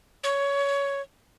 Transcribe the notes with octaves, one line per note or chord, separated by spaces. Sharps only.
C#5